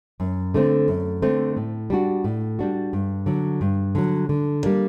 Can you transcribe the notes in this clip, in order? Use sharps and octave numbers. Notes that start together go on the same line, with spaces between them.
F#2
D3 A3 C4
F#2
D3 A3 C4
A2
G3 D4 F#4
A2
G3 D4 F#4
G2
D3 F#3
G2
D3 F#3
D3
G3 A#3 D4